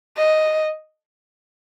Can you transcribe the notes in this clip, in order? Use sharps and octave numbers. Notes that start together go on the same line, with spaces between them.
D#5